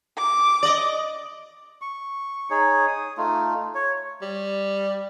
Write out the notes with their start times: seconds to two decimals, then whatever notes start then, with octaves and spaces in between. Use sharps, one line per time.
0.18 D6
0.63 D5 D#5
1.82 C#6
2.50 D#4 G#4 C#5
2.87 D#6
3.18 A3 D#4 F4
3.75 C#5
4.22 G3